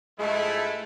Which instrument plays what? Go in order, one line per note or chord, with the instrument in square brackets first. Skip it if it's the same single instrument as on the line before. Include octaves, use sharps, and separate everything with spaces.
[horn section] G2 F3 G#3 [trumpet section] A3 E4